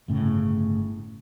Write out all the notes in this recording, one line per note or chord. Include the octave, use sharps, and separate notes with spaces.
G1 A2 C#3